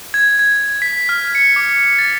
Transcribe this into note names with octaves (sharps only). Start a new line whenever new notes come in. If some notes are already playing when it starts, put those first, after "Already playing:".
G#6
G#6
B6
F6
C#7
D6
A6